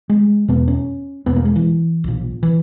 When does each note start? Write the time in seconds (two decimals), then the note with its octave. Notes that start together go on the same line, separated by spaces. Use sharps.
0.09 G#3
0.48 E1 E2 B2 B3
0.68 C#4
1.26 E1 E2 B2 B3
1.36 A#3
1.45 G#3
1.56 E3
2.04 B1 A#2
2.43 E3